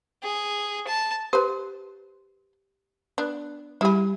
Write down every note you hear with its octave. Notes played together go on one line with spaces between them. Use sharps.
G#4
A5
G4 B4 C5
B3 D4
G3 E4 G4 G#4 B5